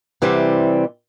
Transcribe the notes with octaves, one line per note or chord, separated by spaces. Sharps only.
C3 E3 G3 C4